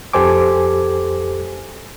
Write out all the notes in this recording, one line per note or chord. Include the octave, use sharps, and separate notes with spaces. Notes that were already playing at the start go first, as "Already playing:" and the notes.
F2 G4 A4 C5 G#5 D6